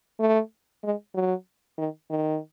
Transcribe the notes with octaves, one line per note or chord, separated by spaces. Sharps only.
A3
G#3
F#3
D#3
D#3